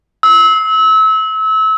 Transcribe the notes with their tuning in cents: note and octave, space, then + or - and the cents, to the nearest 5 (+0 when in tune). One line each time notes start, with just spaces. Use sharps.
E6 -30